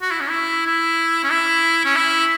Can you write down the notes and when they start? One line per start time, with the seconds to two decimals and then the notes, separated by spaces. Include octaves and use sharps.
0.02 F#4
0.11 E4
0.21 C#4
0.29 E4
0.67 E4
1.24 C#4
1.31 E4
1.85 C#4
1.96 E4